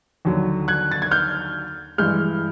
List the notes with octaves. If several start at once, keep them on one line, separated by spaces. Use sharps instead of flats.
D#2 D3 F#3
F#6 G#6
A6
G#6
F6 G6
G2 E3 G#3 F6 G6